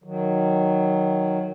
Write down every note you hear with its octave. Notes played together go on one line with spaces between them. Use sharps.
D#3 F#3